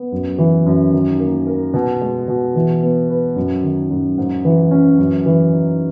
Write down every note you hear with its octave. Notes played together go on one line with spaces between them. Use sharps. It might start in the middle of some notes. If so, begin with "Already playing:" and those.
Already playing: B3
F#2
E3
F#2
D#3
A#3
A#4
B2
G#3
B2
E3
B3
B4
F#2
D#3
F#2
G#2
E3
C#4
F#2
E3
D#4